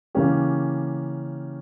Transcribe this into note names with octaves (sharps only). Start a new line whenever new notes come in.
C#3 E3 A#3 C#4 G4